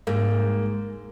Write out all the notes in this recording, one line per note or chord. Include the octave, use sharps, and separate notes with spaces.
G#2 A#3